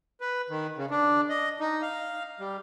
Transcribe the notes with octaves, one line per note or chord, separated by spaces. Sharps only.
B4
D#3
C#3
D4
D#5
D#4
F5
G3